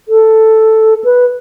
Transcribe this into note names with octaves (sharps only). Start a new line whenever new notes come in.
A4
B4